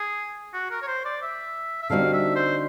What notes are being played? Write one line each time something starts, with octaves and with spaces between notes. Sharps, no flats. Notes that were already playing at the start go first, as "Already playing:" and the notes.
Already playing: G#4
F#4
A#4
C#5
C5
D5
E5
E5
D3 G3 C4 D#4 F#4 F5
E5
C5